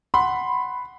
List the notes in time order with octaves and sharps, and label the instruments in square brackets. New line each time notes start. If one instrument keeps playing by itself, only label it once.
[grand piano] F#5 B5 C6